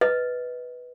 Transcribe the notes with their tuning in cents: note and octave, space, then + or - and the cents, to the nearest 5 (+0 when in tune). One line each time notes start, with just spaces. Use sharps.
B4 +0 D#5 +15